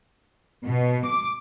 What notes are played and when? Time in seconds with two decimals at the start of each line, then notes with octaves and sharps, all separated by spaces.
0.66 B2
1.06 D6